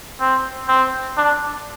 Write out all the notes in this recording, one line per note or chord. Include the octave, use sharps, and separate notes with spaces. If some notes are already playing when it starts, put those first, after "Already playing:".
C4
C4
D4